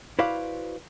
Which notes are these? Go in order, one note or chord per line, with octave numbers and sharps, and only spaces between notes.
E4 F#4 B4 C5 D5 F5